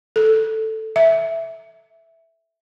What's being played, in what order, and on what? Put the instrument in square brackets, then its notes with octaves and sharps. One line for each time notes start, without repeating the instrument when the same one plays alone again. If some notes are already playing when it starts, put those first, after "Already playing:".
[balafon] A4
E5